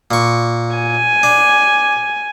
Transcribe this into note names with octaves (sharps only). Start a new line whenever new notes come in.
A#2 C#6
G#5
D4